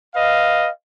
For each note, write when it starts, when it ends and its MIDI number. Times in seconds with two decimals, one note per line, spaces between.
0.15 0.68 71
0.15 0.68 75
0.15 0.68 77